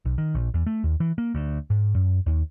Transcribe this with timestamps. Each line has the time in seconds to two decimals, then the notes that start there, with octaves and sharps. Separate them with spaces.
0.05 B1
0.18 D#3
0.35 A#1
0.54 E2
0.66 A3
0.84 D#2
1.00 E3
1.18 A#3
1.35 D2
1.70 G#2
1.95 F#2
2.26 D#2